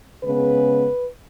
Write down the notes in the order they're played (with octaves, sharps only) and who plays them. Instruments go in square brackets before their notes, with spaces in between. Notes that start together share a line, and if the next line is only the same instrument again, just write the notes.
[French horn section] C#3 G#3 B3 B4